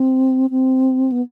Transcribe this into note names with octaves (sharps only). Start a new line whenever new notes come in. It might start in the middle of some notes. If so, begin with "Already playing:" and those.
Already playing: C4
C4
B3